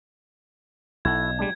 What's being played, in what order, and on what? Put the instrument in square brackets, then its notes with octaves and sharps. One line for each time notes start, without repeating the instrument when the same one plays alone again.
[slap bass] B1 [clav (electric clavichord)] E4 F#4 A4 [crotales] G#6
[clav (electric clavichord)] G3 G#3 D4